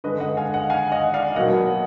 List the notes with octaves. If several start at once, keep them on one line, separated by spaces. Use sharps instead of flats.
D3 G#3 B4 D#5
D#5 F#5
F5 G#5
D#5 F#5
F5 G#5
D#5 F#5
D5 F5
B2 F#3 A#3 D#5 F#5